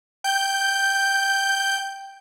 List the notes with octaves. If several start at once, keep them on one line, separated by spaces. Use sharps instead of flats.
G5 G6